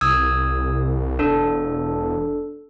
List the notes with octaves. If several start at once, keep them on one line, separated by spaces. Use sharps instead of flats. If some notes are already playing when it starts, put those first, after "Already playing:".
C2 D#6 E6 G#6
E1 D4 A4